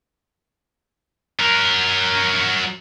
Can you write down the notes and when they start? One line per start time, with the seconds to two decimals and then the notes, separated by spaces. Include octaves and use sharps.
1.39 F#3 A#4